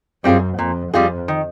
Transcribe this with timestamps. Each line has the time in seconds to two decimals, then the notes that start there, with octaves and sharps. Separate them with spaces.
0.24 F#2 G3 C4 F4 G#4
0.58 F2 A#2
0.93 F2 G3 C4 F4 G#4
1.28 D#3